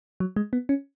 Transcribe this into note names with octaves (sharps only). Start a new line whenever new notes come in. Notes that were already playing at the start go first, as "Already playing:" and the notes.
F#3
G#3
B3
C#4